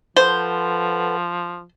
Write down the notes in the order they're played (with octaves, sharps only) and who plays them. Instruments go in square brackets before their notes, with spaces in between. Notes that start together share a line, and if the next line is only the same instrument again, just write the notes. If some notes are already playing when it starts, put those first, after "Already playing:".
[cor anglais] F3 [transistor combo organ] A4 B4 F#5 [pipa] C5